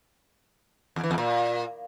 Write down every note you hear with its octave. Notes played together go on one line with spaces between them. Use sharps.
E2
E3
E2
A#2